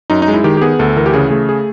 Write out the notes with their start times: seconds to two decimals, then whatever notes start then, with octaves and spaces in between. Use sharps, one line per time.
0.10 F#2 D#4
0.22 D#4
0.28 G#3
0.34 E4
0.44 D#3 G4
0.57 G4
0.61 B3 G#4
0.79 D2 A4
0.96 E3 A#4
1.06 G4
1.14 C#3 G#4
1.31 A3 G#4
1.49 G#4